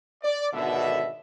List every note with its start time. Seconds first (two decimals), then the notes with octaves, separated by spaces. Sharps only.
0.23 D5
0.54 G#1 B2 D3 E5